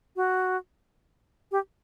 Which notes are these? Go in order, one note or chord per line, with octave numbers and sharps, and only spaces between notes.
F#4
G4